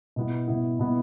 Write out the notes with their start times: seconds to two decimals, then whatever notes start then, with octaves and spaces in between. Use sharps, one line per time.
0.16 B2 B3 E4
0.48 B2 B3 E4
0.79 B2 B3 E4